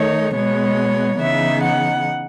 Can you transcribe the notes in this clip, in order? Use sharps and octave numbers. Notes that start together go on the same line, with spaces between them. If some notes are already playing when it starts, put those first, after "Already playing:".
Already playing: D#3 A3 D#4 C#5
B2 G#3 B3 C#5
C#3 E3 B3 D#4 E5
F#5